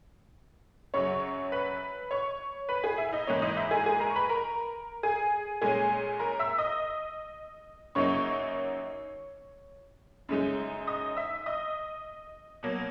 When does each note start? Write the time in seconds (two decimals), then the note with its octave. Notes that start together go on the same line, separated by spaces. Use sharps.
0.94 F#2 C#3 F#3 C#5 C#6
1.52 B4 B5
2.11 C#5 C#6
2.69 B4 B5
2.84 G#4 G#5
2.98 E4 E5
3.09 E5
3.12 D#4 D#5
3.27 G#2 E3 A#3 C#4 C#5
3.42 D#4 D#5
3.57 E4 E5
3.71 G#4 G#5
3.86 G#4 G#5
4.00 A#4 A#5
4.10 C#6
4.16 B4 B5
4.29 A#4 A#5
5.03 G#4 G#5
5.62 A#2 G#3 C#4 G#4 G#5
6.20 A#4 A#5
6.39 E5 E6
6.58 D#5 D#6
7.95 F#2 C#3 F#3 A#3 D#4 C#5 C#6
10.29 F#2 C#3 G#3 D#4
10.87 D#5 D#6
11.17 E5 E6
11.46 D#5 D#6
12.63 B2 F#3 A#3